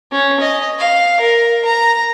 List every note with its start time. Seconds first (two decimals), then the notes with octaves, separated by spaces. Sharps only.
0.11 C#4
0.40 D#5
0.79 F5
1.20 A#4
1.65 A#5